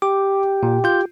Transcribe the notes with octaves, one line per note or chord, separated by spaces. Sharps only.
G4 D6
A#2
F4 G6